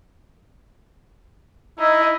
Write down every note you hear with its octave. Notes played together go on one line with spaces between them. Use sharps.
D#4 E4